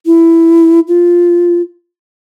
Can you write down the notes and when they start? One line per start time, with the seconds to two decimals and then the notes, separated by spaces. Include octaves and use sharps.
0.06 E4
0.88 F4